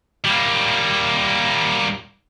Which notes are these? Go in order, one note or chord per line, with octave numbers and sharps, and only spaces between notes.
G3 A#3